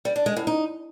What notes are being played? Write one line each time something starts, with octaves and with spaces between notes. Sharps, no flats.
G3
D4
G#3
A2
D#4